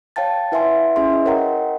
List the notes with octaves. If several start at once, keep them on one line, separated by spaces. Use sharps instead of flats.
C#5 F5 G5 A5 A6
E4 B4 E5 F#5 G#5 C6
C#4 E4 G#4 E5 C6
B4 D#5
A#4 C#5 D#5 F#5 G5 A#5